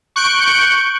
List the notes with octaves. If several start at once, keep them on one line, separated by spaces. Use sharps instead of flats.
C#6 F#6 G6 D7